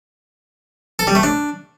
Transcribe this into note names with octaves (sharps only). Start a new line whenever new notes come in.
A4
G3
A3
D4